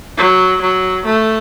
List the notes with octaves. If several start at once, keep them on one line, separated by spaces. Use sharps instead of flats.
F#3
F#3
A3